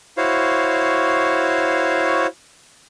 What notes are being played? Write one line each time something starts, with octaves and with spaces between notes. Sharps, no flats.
E4 F#4 C5 C#5 F5